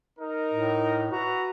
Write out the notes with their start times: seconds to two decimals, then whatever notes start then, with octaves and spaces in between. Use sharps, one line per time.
0.19 D#4 A#4
0.54 A2
1.11 F#4 B4 E5 A#5